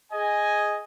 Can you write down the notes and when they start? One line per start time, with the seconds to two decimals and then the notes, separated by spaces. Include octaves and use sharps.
0.13 G#4 D#5 G#5